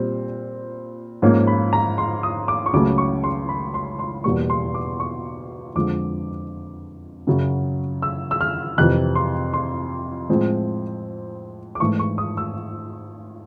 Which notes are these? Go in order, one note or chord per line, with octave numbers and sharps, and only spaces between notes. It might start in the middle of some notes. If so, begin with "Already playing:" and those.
Already playing: A#2 G3 C4
G#2 F3 A#3 C#4
B5
A#5
C6
D#6
D6
C#6
C#2 C#3 F#3 A3 C#4 D6
C#6
C6
B5
C6
C6
E2 B2 G3 A#3 C#6
C6
D6
C#6
F2 D3 F3 G#3 D6
F#2 C#3 F#3
E6
E6
F6
F2 C3 E3 F#6
C6
C6
A2 F3 G#3 C4
D6
G#2 E3 A3 C#6
C#6
D#6
E6